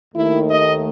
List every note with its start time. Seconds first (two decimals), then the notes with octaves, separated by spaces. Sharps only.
0.15 D#2 D#3 A3 E4
0.50 D#5